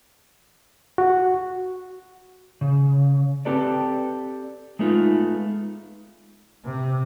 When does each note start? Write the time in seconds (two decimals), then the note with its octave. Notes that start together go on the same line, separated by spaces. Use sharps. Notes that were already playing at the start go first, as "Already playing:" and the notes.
0.98 F#4
2.61 C#3
3.45 C4 G4 A4 B4 D5
4.79 G#3 A3 B3 D#4 F4
6.65 C3